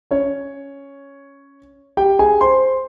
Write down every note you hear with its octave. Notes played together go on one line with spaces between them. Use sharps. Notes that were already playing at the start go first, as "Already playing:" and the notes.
C#4 C#5
G4 G5
G#4 G#5
C5 C6